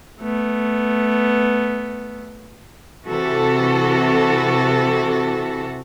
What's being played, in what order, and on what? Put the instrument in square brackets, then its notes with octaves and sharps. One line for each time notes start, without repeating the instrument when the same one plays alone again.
[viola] A3 B3
[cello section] C3 E3 F#4 A4